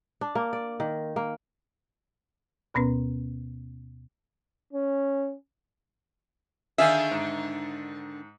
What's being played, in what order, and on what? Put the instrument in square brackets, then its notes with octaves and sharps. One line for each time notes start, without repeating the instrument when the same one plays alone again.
[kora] D4
A#3
D5
D#3
A#3
[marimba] D2 B2 B3 C#4 B4
[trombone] C#4
[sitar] D3 D#3 D4 [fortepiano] G#4 F5 G#5 [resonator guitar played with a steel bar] E5
[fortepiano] G#2